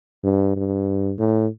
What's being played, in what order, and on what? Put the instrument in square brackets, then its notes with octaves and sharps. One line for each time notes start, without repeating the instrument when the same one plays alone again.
[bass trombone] G2
G2
A2